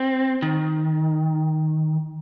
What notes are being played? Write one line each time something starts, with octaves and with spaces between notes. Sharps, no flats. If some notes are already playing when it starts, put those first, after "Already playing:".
Already playing: C4
D#3